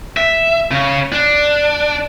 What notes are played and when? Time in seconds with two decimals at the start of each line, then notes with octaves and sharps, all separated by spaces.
0.17 E5
0.71 C#3
1.12 D4